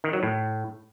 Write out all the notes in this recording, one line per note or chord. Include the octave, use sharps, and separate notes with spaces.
D#3
F#3
A2